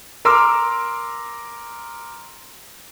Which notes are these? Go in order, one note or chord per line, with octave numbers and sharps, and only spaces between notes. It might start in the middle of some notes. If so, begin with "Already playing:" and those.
A#4 A#5 C6 D6 E6 F6